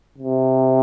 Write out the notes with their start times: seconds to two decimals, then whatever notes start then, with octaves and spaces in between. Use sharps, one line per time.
0.18 C3